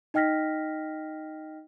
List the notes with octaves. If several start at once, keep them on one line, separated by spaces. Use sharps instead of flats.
D#4 D#5 G5 F6 A#6 B6